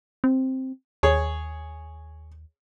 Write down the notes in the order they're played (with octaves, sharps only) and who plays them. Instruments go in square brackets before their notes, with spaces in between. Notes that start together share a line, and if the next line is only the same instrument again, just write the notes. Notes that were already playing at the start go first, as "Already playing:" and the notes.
[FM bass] C4
[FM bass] D#2 [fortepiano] G#4 C#5